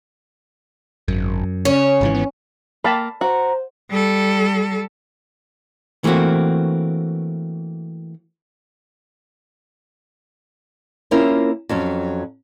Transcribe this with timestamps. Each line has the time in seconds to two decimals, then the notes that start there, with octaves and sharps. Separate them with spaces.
1.08 G#1 F#2
1.65 C#3 C#4 C#5
2.01 G#1 G#2 E3
2.15 B3
2.84 A#3 G5 A5 B5
3.21 F#4 C5 A#5
3.91 G3 A4
6.04 E3 A3 A#3 C4 F#4
11.11 A#3 C4 C#4 E4 F4 A#4
11.69 F2 F#3 C#4